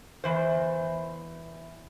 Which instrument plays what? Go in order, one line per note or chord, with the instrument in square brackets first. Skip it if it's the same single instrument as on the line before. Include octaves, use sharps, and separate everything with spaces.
[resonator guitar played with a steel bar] E2 E3 C5